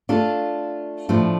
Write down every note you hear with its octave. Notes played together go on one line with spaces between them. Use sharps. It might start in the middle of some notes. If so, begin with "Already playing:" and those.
A3 D4 F4 A4
A2 F3 A3 D4